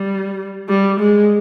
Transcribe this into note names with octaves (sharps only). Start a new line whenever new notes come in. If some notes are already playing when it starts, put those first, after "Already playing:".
Already playing: G3
G3
G#3